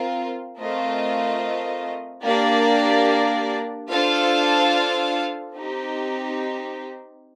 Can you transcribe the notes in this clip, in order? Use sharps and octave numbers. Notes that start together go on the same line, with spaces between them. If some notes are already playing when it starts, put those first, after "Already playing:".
Already playing: C4 F4 A#4
A3 C4 F4 A#4 D#5
A#3 D4 G4 D5
D4 F4 A4 C5 F5
C4 D#4 G4